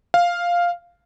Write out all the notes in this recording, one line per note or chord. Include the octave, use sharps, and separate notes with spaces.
F5